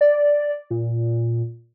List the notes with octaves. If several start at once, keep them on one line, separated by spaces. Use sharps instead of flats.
D5
A#2